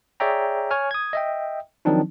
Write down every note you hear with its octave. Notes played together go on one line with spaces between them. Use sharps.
G#4 C#5 D5 E5 G5 A#5
C#5 G#5 F6
D#6 G#6
D#5 E5 G5
D#3 F3 F#3 C4 D4 D#4